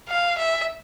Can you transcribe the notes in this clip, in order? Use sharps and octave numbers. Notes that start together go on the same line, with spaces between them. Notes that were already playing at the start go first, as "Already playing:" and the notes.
F5
E5